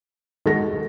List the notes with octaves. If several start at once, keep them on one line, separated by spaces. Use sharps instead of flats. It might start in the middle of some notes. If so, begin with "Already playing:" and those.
D#3 G#3 F#4 A4 A#6